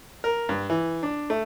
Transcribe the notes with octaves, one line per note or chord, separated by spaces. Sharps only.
A#4
G2
E3
D4
A3